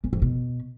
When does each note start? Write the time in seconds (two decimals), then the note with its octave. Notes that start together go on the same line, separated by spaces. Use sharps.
0.04 E2
0.13 F2
0.22 B2